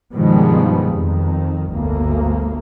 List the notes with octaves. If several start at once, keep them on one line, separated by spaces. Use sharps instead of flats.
G2 B2 D#3 F3 G3 G#3
F2 D#3
G1 D2 A#3